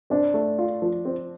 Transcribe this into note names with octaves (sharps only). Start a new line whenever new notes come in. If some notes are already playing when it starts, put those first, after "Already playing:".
C4 D4
A3
F4
F3
C4